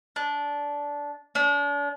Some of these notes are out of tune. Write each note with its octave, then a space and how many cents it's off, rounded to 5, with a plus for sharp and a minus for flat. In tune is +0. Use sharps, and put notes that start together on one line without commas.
D4 -15
D4 -40